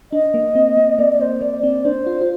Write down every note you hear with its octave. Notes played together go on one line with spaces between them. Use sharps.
D4 D#5
A#3
C4
C4
A#3 D5
D5
C4 C5
A#3 D5
C4 D5
D4 C5
F4
F4